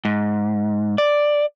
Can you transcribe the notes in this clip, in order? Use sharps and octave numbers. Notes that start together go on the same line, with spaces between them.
G#2
D5